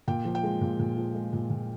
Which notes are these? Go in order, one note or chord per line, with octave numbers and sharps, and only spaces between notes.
A#2 G5
F3
G5
G#3
A#2
A#2
F3
G#3
A#2
A#2